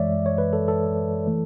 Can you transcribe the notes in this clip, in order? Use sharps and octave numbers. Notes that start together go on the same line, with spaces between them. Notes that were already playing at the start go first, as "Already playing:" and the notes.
Already playing: F#2 E3 G#3 C#5 D5 E5
C#5
B4
A4
A4
E3 A3